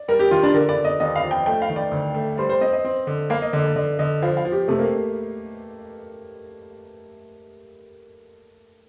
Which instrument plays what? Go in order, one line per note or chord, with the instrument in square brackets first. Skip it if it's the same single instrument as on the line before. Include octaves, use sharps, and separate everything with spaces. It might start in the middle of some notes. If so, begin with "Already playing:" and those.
Already playing: [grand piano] D5
[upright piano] G3 [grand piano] A#4
[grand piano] G4
[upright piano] D#3 [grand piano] F4
[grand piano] D4
[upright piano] D3 [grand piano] A#4
[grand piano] D5
[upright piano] D3
[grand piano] D#5
[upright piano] D#2 [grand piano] D#5
[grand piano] F5
[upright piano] F3
[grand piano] G5
[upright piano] A3 [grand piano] G5
[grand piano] F5
[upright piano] D#3
[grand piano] D5
[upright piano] D2
A3
[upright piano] G3 [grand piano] C5
[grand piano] C5
[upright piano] C4 [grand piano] D#5
[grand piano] D#5
[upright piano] C4
D3
[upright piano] A#3 [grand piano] F5
[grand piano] D#5
[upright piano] D3 [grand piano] D#5
[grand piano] D5
[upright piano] D3 [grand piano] D#5
[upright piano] D3 [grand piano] D#5
[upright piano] F3 [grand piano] F5
[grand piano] F5
[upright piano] F3
[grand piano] G4
[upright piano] C3 [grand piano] A3
[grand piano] A#3